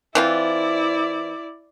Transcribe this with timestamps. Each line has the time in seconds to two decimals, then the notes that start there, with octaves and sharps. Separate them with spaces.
0.15 E3 C4 E4 F4 D5